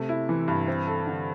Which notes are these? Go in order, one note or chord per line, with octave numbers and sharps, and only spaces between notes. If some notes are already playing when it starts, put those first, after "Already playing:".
Already playing: C3 A3
E4
E3
G2
C4
A4
D3